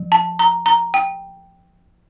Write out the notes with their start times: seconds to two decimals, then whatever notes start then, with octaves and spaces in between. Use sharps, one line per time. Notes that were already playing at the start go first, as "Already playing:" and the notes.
Already playing: F3
0.12 A5
0.39 A#5
0.66 A#5
0.94 G5